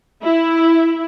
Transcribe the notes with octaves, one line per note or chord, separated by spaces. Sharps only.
E4